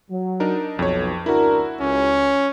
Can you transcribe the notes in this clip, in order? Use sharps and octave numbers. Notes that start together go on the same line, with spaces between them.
F#3
D4 D#4 A#4
B1 F2 C#5
C#2 D4 E4 F#4 A#4
C#2 C#4